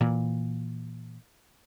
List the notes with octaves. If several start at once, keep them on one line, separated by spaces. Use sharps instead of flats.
A#2 E3